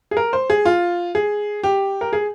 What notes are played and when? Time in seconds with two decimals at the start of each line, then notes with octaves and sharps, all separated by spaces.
0.11 G#4
0.17 A#4
0.33 C5
0.50 G#4
0.65 F4
1.15 G#4
1.64 G4
2.01 A#4
2.13 G#4